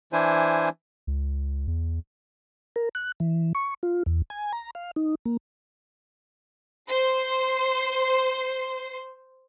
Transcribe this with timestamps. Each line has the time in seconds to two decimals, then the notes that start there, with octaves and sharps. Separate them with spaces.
0.13 E3 D4 E4 C5 G#5
1.07 C#2
1.67 E2
2.76 A#4
2.95 F#6
3.20 E3
3.55 C#6
3.83 F4
4.06 E2
4.30 G#5
4.53 A#5
4.75 F5
4.96 D#4
5.25 A#3
6.87 C5 C7